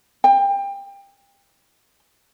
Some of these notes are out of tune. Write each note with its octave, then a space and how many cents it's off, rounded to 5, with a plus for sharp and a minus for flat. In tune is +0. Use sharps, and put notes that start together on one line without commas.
G5 +25